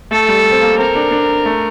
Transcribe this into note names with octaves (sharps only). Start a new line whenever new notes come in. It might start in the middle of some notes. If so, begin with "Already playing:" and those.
A3 A4
G3
C4
A#3
C4 A#4
D4
D4
A3